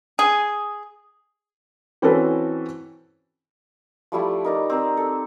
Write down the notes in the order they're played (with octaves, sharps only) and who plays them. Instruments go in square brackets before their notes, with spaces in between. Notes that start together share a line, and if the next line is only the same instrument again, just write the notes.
[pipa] G#4
[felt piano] E3 C4 C#4 F#4 A4 B4
[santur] F3 G3 A3 E4
D#4 A#4 D5
C4 A#4
A4